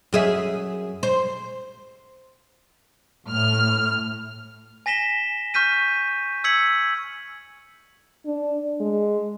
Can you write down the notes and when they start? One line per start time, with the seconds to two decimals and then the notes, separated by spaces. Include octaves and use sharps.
0.13 F#2 G#4 E5
1.03 C5
3.27 A2 F6
4.86 G#5 A#6 B6 E7 G7
5.54 C#6 F6 G6 B6 D#7
6.44 E6 G#6 B6 C#7 F#7
8.26 D4
8.80 G#3